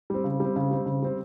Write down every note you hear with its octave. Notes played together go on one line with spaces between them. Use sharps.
G3 C4
C#3
G3 C4
C#3
G3 C4
C#3
G3 C4